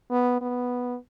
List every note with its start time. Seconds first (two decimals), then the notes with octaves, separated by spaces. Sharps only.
0.11 B3
0.41 B3